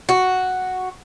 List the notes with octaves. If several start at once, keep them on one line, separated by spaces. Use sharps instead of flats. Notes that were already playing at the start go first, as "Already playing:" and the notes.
F#4